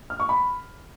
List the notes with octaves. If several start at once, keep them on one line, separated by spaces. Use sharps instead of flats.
F6
C#6
B5